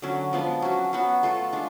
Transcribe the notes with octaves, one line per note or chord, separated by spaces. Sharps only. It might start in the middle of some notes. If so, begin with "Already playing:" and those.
D3 F#3 C#4
F3 G#3 B3 D4
F#3 C#4 F#4
F#3 B3 F#4
A3 F4 A4
G#3 D4 F4